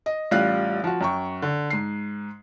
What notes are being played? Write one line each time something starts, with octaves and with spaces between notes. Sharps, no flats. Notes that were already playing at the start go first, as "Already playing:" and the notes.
D#5
A1 G3 F4 F5 F#6
F3 F#4
F#2 G5 C#6
D3
G#2 C7